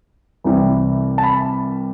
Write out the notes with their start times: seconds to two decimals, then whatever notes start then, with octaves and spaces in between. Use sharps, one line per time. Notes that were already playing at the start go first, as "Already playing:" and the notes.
0.44 C2 C3 E3 G3
1.18 A5
1.24 B5